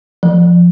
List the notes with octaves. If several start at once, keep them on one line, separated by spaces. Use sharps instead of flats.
F3